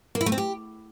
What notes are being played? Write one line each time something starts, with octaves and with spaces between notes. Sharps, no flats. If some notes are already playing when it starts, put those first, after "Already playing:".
A#3
E4
A3
C4
G4